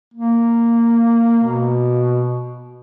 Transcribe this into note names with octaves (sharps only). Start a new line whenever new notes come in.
A#3
B2